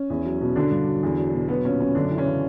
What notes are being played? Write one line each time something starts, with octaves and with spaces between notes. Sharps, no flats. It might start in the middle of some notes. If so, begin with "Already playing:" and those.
Already playing: C#4
E2
F#3
B2
D3 F#3 D4
G2
F#3
E2
F#3
B2
F#3 B3
A#2 C#4
F#3 C#4
F#2 D3 D4
E3
C#4
C#3